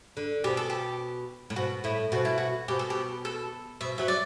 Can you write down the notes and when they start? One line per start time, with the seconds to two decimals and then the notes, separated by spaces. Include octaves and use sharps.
0.17 D3
0.44 B2 G4
0.57 A4
0.70 G4
1.50 A2
1.56 B2 F#4
1.84 A2 E4
2.12 B2 F#4
2.25 E4
2.38 F#4
2.68 B2 G4
2.79 A4
2.90 G4
3.25 A4
3.81 B2 E5
3.98 F#3 E5
4.08 D5